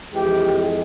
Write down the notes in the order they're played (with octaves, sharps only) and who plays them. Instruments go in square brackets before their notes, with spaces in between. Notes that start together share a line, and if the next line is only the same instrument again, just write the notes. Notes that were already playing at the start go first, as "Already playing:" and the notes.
[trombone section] F2 E3 G#3 G4